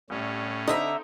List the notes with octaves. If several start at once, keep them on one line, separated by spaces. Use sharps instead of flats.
C2 A2 C#4
D3 C4 D#4 A4 D#5 E5 A#5 B5